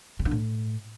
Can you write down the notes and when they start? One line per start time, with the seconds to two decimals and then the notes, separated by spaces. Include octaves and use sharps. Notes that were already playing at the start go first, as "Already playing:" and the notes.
0.19 C#3
0.25 D3
0.31 A2